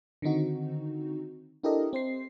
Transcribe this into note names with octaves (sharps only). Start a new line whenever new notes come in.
D3 D#3 C4 D#4 F#4
D4 E4 G4 A4 A#4 D#5
C4 C5 C7